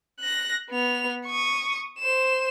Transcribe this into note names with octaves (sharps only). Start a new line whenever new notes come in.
F#6 A#6
B3 F7
C#6 D#6
C5 E7